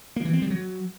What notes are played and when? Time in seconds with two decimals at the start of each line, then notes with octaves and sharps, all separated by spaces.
0.16 A#3
0.25 E3
0.33 C4
0.42 G3
0.50 F#3